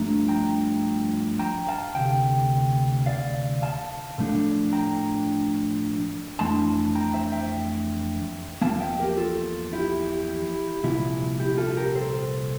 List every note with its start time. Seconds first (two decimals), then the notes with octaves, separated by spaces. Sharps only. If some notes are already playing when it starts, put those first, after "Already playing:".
Already playing: G2 F3 A3 D4 A#5
0.28 G5 A#5
1.39 G5 A#5
1.68 F5 A5
1.95 D2 C3 G5
3.06 D5 F5
3.62 F5 A5
4.18 A2 F3 A3 D4
4.73 G5 A#5
6.39 F2 E3 A3 D4 A5 C6
6.95 G5 A#5
7.14 C5 E5
7.32 E5 G5
8.61 E2 C3 F3 A#3 F5 A5
8.80 E5 G5
8.99 G4 A#4
9.17 F4 A4
9.73 E4 G4
10.84 C2 A#2 F3 E4
11.40 E4 G4
11.58 F4 A4
11.77 G4 A#4
11.95 A4 C5